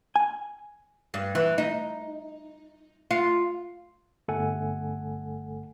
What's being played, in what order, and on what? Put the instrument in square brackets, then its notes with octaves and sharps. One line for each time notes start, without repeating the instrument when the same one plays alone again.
[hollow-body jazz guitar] G#5
[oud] G2
E3
D#4
F4
[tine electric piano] G1 A3 A4 F#5 G#5